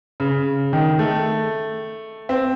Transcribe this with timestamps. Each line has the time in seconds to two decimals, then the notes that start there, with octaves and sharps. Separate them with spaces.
0.20 C#3
0.73 D#3
0.99 A3
2.29 C4